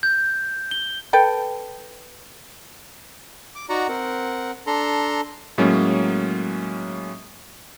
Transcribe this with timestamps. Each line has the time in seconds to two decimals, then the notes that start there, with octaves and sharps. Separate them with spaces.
0.03 G6
0.71 G7
1.13 A4 B4 G5
3.55 D6
3.69 D#4 F#4 D5 F#5 A#5
3.89 C4 A#4 F#5
4.67 D4 A4 A#5 C6
5.58 A2 F#3 G#3 A#3 C#4